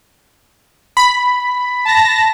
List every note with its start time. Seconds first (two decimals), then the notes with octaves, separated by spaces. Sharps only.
0.97 B5
1.85 A5 A#6